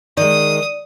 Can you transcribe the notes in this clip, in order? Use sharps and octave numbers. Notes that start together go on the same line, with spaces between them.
D#3 G#3 D5 D#6